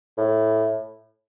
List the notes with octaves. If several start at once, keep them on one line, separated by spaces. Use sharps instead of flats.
A2